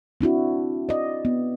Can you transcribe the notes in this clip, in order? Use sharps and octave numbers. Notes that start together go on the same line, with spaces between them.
C4 D4 E4 F#4
D5 D#5
B3